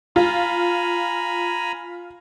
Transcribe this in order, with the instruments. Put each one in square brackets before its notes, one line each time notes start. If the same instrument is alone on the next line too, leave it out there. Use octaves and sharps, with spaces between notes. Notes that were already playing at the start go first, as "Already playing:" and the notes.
[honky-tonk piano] F4 [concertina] G#5 A#5 B5